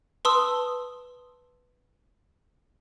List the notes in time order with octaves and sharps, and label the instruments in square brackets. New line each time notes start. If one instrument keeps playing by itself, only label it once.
[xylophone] B4 A5 C6 D#6 E6